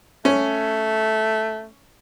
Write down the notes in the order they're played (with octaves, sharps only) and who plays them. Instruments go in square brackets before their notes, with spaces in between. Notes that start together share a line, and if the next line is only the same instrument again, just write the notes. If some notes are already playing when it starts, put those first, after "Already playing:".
[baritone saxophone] A3 [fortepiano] C#4